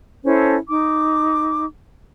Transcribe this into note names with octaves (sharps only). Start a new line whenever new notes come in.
C#4 E4 A4 C5
D#4 D6